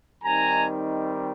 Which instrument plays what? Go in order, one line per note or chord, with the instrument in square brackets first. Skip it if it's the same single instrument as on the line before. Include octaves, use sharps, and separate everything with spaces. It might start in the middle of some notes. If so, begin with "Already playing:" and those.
[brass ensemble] D#3 G3 C4 D#4 G#5 A#5